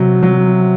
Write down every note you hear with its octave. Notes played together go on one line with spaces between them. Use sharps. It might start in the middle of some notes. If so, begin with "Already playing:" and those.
Already playing: C3 F#3
F#3